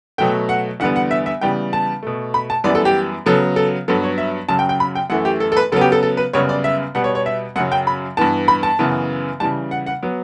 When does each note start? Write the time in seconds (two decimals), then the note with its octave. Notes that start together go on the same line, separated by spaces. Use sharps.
0.18 B2 F#3 A3 G5
0.49 F#5
0.80 E2 D3 G3 B3 F#5
0.96 F#5
1.11 E5
1.26 E5
1.41 C#3 E3 G3 B3 G5
1.73 A5
2.03 B2 A3
2.34 B5
2.50 A5
2.64 F#2 E3 G3 B3 D5
2.75 A4
2.85 G4
3.26 C#3 F#3 B3 A4
3.56 A4
3.88 G2 F#3 B3 A4
4.03 C#5
4.18 E5
4.49 F#2 C#3 F#3 A5
4.59 G5
4.69 G5
4.80 B5
4.95 G5
5.10 F#2 E3 A3 F#5
5.25 G4
5.40 A4
5.52 A4
5.57 B4
5.72 C#3 F#3 B3 A4
5.81 G4
5.92 A4
6.03 A4
6.17 B4
6.33 F#2 C#3 G3 B3 C#5
6.49 D5
6.64 E5
6.95 B2 G3 B3 F#5
7.04 C#5
7.15 C#5
7.26 E5
7.56 F#2 C#3 F#3 F#5
7.72 G5
7.87 B5
8.17 G2 E3 B3 A5
8.48 B5
8.63 A5
8.79 F#2 C#3 E3 B3
9.40 C#3 E3 G3 A5
9.71 F#5
9.86 F#5
10.03 F#3 B3